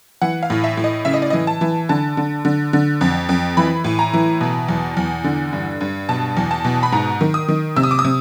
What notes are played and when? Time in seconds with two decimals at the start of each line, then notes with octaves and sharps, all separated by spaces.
0.22 E3 F#5
0.43 F5
0.50 A2
0.64 E5
0.77 A2
0.84 D#5
1.05 C#3 E5
1.14 D#5
1.22 D5
1.30 E3 D#5
1.47 A5
1.61 E3
1.89 D3 A5
2.17 D3
2.45 D3
2.73 D3
3.01 F2
3.29 F2
3.57 E3 B5
3.84 A2
3.99 A#5
4.14 E3
4.41 B2
4.68 E2
4.97 E2
5.24 D3
5.53 G2
5.80 G2
6.09 B2 A5
6.37 E2
6.51 A5
6.64 B2
6.83 B5
6.92 G#2 A#5
7.21 D#3
7.34 D#6
7.48 D#3
7.76 C3 E6
7.83 D#6
7.91 D6
7.99 D#6
8.04 C3